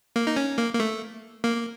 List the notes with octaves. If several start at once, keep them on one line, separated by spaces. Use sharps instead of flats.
A#3
D#4
C#4
A#3
A#3
A3
A#3